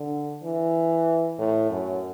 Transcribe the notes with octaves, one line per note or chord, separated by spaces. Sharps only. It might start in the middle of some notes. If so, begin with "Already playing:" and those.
Already playing: D3
E3
A2
F#2